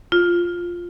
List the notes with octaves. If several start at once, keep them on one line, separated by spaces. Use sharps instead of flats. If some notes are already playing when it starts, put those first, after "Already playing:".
F4